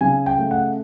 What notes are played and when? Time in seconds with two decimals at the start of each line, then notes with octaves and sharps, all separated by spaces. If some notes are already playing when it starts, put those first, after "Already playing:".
0.01 C#3 G#5
0.26 G5
0.38 A3
0.51 F#5